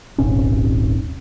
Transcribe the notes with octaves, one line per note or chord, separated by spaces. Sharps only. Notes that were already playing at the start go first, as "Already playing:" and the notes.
D#1 G#1 C3 C#4